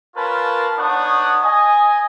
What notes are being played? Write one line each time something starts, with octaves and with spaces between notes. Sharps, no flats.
C#4 F4 A#4 B4 C#5 A5
B3 D4 D#4 C#5 F#5 D#6
D#5 G#5